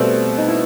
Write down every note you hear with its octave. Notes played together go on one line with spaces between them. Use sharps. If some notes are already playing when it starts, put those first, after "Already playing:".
Already playing: B2 G3 A3 C4
D#4
E4